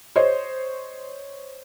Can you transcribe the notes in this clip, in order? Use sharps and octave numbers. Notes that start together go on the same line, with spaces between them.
C5 C#5 D#5